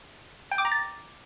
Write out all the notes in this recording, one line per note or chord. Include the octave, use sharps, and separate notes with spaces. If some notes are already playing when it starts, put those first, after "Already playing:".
G5
D6
A#5
A6